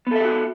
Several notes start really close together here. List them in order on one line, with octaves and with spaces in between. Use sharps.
B3 A4 E5 G4 F#4